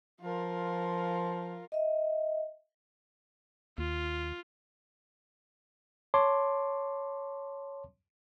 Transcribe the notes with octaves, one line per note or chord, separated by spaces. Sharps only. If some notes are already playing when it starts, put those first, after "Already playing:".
F3 F4 A#4
D#5 E5
D#2 F4
C#5 A5 C6 D6